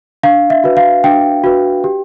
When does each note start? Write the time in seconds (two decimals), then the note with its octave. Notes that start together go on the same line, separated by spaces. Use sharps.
0.23 D4 F5
0.50 E5
0.64 F#4 B4
0.77 F5
1.04 D4 G5
1.44 F#4 B4
1.84 G4